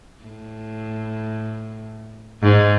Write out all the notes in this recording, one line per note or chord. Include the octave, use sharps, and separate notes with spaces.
A2
G#2